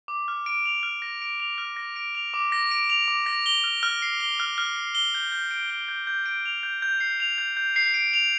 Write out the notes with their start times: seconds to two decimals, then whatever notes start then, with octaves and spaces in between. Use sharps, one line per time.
0.08 D6
0.28 F6
0.46 D7
0.65 F7
0.83 F6
1.02 A#6
1.22 D7
1.40 F7
1.58 F6
1.77 A#6
1.96 D7
2.15 F7
2.34 D6
2.52 A#6
2.71 D7
2.90 F7
3.08 D6
3.26 A#6
3.46 G7
3.64 F6
3.83 F6
4.02 C7
4.21 G7
4.40 F6
4.58 F6
4.76 C7
4.95 G7
5.15 G6
5.32 G6
5.51 D7
5.70 G7
5.88 G6
6.07 G6
6.26 D7
6.46 F7
6.63 G6
6.82 G6
7.00 C7
7.20 F7
7.38 G6
7.57 G6
7.76 C7
7.94 D7
8.13 F7